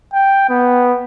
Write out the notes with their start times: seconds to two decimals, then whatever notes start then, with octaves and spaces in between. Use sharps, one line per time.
0.14 G5
0.49 B3